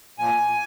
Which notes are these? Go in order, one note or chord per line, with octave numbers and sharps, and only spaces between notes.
A#2 F3 A#3 G#5